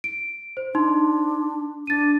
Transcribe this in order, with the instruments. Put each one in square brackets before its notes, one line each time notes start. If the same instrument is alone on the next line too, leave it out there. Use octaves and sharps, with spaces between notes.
[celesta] D7
C5
[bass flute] D4 [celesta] D#4 C6
[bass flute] D4 [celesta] A6 D#7